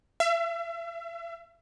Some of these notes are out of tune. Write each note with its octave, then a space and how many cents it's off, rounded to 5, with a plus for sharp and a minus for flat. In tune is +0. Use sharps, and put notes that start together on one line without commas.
E5 +40